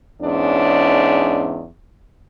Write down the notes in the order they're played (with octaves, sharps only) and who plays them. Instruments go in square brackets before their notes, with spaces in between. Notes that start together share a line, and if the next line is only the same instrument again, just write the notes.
[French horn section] E2 G#2 C#4 D4